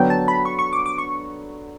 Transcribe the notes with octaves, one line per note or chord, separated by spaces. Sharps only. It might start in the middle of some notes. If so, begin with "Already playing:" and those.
Already playing: D3 F#3 B3 D4 G5
A5
B5
C#6
C#6
D6
D6
C#6